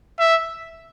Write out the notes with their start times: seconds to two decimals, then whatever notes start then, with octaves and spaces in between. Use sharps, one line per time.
0.19 E5